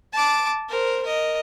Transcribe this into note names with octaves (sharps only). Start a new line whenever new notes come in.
A5 D6
A#4 C5
A#4 D#5